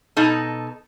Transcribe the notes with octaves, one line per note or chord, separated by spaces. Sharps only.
B2 D#4 A4